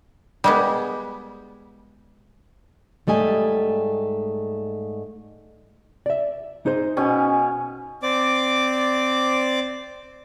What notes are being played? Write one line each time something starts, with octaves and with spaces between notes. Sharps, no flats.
G3 G#3 B3
G#2 G3 A3 D#5 G#5
D5 E5
D#4 G#4 C5
B2 C#4 G#5
C4 D5 D6